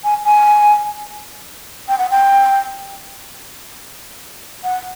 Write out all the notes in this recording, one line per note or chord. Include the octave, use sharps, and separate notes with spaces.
G#5
G#5
G5
F#5
G5
F#5